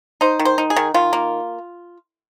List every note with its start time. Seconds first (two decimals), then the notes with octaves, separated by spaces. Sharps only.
0.21 D#4 C5
0.40 D#3
0.45 C5
0.58 D#4
0.70 G#4
0.76 D#3
0.94 D#3 F4
1.13 A#3